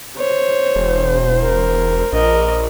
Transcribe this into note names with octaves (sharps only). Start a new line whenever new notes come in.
C5 C#5
E1
A#4
A#1 A#4 D#5